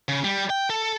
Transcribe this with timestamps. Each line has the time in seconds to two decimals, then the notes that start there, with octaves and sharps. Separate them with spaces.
0.09 C#3
0.24 G3
0.50 G5
0.70 A4